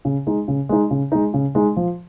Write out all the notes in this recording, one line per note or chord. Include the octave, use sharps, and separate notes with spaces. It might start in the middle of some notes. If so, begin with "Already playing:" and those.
C#3
G#3 D#4
C#3
G#3 D#4
C#3
G#3 D#4
C#3
G#3 D#4
F3